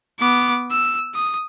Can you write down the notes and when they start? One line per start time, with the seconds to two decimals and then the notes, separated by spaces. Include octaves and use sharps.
0.20 B3 D6
0.71 E6
1.15 D#6